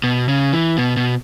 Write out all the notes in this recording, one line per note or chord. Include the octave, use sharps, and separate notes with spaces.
B2
C#3
E3
B2
B2